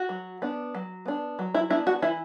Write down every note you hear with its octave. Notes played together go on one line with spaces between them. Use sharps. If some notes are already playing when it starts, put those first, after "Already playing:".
Already playing: F#4
F#3
B3 D4
F#3
B3 D4
F#3
E4
B3 D4 E4
F#4
E3 E4